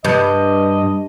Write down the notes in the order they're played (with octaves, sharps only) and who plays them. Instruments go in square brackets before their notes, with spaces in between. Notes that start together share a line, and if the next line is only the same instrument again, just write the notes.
[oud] G2 [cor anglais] D#5